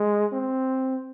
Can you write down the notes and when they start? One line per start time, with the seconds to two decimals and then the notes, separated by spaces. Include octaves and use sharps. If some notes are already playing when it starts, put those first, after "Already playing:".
Already playing: G#3
0.33 C4